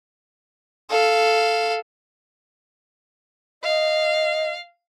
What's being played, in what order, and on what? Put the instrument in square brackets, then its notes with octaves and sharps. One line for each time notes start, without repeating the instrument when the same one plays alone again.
[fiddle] A4 F5
[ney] D#5 [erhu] F5